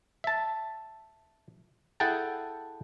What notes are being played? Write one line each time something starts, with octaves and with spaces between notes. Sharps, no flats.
E5 A5
E4 G#4 A4 F#5 G5 A5